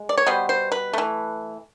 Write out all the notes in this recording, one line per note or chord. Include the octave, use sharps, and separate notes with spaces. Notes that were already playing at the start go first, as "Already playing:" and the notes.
Already playing: G#3
D5
C#5
B2 G3 B3 C5
C5
B4
E3 A3